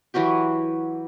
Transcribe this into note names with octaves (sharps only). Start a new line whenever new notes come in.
E3 F#3 F#4 G4